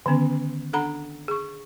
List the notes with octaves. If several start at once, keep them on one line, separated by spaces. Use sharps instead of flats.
D3 D#3 B3 C#4
D4 A4 F#5 A#5 B5
G#4 C#6